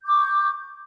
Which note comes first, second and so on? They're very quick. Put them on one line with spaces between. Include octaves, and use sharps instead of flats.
G6 D6 C#6